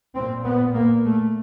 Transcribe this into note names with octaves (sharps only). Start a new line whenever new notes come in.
A#2 C4
B3
A#3
A3